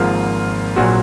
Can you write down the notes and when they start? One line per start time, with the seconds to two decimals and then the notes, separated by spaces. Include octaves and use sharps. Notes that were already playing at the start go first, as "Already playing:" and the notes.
Already playing: G#1 G#2 F3 A#3 F4
0.76 A#1 A#2 F#3 F#4